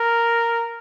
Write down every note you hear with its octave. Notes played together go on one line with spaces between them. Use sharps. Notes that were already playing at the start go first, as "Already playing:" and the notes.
Already playing: A#4